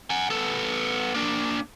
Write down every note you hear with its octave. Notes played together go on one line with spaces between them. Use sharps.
F#5 G#5
B3 A4
A#3 D4